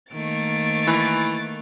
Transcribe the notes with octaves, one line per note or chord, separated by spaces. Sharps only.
D#3 A3 A#3 A6 D7
E3